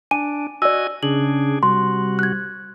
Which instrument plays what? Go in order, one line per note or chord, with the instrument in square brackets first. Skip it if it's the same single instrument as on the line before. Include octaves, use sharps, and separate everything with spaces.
[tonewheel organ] D4 [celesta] G#5 D#7
[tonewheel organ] F#4 D#5 G#5 [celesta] D5 E6
[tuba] C#3 [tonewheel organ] D4 G#4 [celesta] F#7
[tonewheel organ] C3 F#4 [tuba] G3 [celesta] C6
[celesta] F#6 G#6